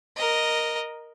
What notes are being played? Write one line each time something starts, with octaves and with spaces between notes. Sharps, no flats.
A#4 D#5